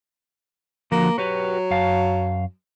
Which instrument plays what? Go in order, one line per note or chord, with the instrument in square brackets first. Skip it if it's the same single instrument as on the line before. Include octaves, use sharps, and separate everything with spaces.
[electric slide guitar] D3 F3 F#4 [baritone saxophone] A#3
[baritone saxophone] F#3 [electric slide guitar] F#4 G4 B4
[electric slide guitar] F#2 F5 A5